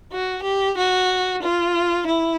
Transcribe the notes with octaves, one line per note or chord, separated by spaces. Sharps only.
F#4
G4
F#4
F4
E4